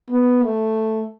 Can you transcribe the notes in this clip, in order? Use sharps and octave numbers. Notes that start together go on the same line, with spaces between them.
B3
A3